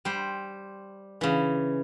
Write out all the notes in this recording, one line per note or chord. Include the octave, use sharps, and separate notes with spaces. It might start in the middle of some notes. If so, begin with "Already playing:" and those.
G3 C5
C#3 E3